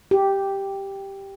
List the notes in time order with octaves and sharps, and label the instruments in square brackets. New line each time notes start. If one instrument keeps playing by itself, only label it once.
[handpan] G4